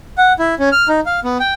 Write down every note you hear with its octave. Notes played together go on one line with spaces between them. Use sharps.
F#5
E4
C#4
F6
D#4
F5
B3
G5